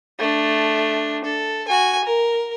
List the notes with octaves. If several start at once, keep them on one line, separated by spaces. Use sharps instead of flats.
A3 D4
A4
F#4 G#5
A#4